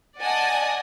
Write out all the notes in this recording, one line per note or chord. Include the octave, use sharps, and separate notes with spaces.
D5 D#5 F#5 G#5 A5 D#6